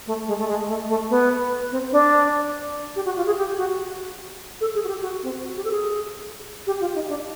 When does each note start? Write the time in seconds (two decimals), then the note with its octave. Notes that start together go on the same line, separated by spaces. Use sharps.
0.07 A3
0.27 G#3
0.39 A3
0.48 G#3
0.68 A3
0.89 A3
1.10 B3
1.72 C4
1.92 D4
2.96 G4
3.05 F#4
3.17 F4
3.26 G#4
3.37 G4
3.58 F#4
4.61 A4
4.75 G#4
4.84 F#4
4.88 G4
5.02 F#4
5.23 C4
5.43 F#4
5.57 G4
5.64 A4
5.71 G#4
6.67 G4
6.81 F4
6.95 D#4
7.08 D4